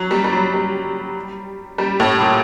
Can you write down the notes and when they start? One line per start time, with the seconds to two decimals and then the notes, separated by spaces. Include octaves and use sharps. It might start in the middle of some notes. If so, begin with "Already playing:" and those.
Already playing: F#3
0.11 G3
0.24 G3
0.32 F#3
0.54 G3
1.78 G3
2.00 A2
2.21 A#2